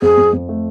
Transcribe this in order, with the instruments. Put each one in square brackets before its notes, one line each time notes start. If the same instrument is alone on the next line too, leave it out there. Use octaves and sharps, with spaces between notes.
[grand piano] F2 [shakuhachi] G#4
[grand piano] F2
F2
A3